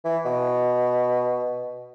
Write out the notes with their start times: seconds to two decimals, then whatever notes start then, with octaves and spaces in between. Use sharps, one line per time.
0.05 E3
0.25 B2